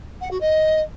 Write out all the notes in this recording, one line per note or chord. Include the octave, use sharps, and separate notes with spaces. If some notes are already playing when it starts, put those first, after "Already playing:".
F#5
F#4
D#5